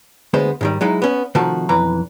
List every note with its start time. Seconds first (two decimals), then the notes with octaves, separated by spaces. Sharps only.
0.34 D2 G#3 B3 C5 C6
0.61 G#2 D#3 G3
0.81 F#3 G#3 D#4 E4
1.02 B3 C#4
1.35 C3 D#3 F3 A3 F#4 A5
1.69 B1 F2 E3 B4 A#5